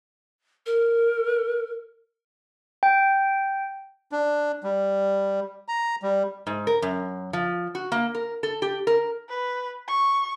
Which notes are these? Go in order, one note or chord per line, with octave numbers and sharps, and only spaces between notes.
A#4
G5
D4
G3
A#5
G3
G#2
A#4
F#2
F3
F#4
A#3
A#4
A4
G4
A#4
B4
C#6